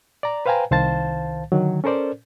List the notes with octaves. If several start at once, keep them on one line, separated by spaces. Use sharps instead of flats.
D5 A#5
B4 C5 F5 G5 G#5 A#5
C2 D#3 C5 F5 A5 A6
D3 D#3 F#3
C#4 A4 A#4 C5 D5